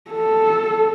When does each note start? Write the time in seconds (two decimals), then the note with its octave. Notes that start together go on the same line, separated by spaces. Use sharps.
0.11 A4